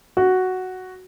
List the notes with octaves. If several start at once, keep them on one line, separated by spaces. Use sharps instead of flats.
F#4